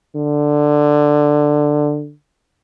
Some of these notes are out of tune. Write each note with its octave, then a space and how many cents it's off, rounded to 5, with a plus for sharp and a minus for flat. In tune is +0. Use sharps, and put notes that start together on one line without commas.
D3 +10